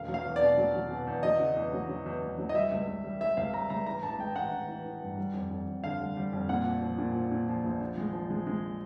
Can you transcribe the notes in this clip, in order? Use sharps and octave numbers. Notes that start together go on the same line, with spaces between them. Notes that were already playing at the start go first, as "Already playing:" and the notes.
Already playing: E1 F5
F#3
F5
E2
D5
B2
F#3
F#3
B2
E2
F#3 D#5
C#3
E2
F#3
F#3
E2
E2
F#3
D#5
G3 E5
C#2
C#2
G3
G3 E5
C#2 F5
G3 A#5
C#2 A#5
E3 A#5
A1 A5
G#3 G5
A1 F#5
A1
E3
E3
G2
G3
F2
F2
F2
D3 F5
G3
G3
F2
A#2 F#5
F3
F3
A#2
F3
A#2
F3
A#1
F3
G#3
F3
G#3
G#3